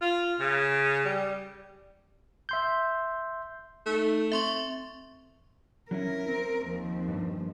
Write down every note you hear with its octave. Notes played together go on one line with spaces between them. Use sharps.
F4
C#3
G3
E5 C6 G6
A3 D#4
C4 E5 C6 C#6
F#3 C#4 E4 A#4
C4
D#2 F3
G2